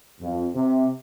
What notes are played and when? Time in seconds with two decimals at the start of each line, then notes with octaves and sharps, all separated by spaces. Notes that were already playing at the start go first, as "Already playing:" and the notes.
0.20 F2
0.54 C3